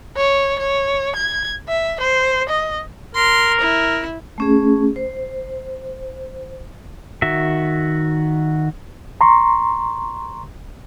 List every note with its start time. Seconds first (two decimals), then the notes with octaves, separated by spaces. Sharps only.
0.16 C#5
0.59 C#5
1.16 G#6
1.68 E5
2.00 C5
2.49 D#5
3.15 A#4 C6
3.61 E4
4.38 A3 C#4 G#4
4.96 C5
7.22 D#3 F#4 E5
9.21 A#5 C6 C#6